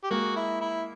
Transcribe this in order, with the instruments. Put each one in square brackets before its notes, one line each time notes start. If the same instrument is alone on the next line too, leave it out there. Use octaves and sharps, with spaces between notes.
[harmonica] G4
[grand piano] G#3 A#3 [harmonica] F#4
[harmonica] E4
E4